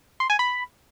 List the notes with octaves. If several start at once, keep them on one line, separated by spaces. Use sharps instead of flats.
C6
G#5
B5